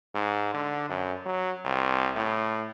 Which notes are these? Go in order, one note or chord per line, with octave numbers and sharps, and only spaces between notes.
G#2
D3
F#2
F#3
C2
A2